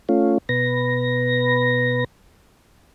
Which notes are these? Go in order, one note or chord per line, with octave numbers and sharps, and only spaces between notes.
A3 C#4 F4
B2 B4 A#6